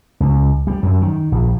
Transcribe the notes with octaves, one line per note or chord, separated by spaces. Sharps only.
C#2
G3
F#2
D#3
A#1